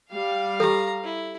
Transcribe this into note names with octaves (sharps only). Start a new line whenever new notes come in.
G3 F5
G4 A4 A#5
E4